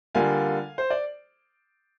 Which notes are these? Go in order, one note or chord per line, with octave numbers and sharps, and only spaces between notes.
D3 G3 A#3 F4 F5 G#5
C5
D5